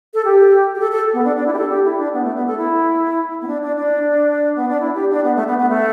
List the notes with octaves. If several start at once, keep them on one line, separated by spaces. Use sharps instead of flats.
A4
G4
G4
A4
A4
B3
D4
D4
E4
G4
A4
G4
E4
D4
B3
A3
B3
A4
E4
B3
D4
D4
D4
B3
D4
E4
G4
D4
B3
A3
B3
B3
A3